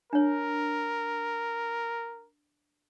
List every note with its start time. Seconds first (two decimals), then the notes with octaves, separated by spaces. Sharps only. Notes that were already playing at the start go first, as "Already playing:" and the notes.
0.13 D4 A#4 C#5